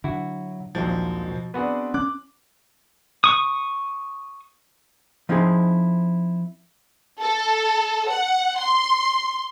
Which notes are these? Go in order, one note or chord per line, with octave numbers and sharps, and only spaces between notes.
D3 F#3 E4 F#4
A#1 D#2 F3 F#3 G#3 C4
B2
B3 C4 D4 F#4 G#4 B4
C#4 D6 F#6
C#6 D#6
F3 C4 D#4 E4 G#4
A4
F#5
C6